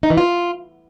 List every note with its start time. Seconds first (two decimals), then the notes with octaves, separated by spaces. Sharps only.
0.03 D#4
0.10 E3
0.17 F4